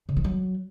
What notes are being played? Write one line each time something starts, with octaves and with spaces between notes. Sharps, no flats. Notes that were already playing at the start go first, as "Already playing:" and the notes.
C#3
E3
F#3